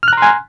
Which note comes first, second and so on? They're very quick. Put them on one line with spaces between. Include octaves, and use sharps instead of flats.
F6 F#6 A#5 C6 G#5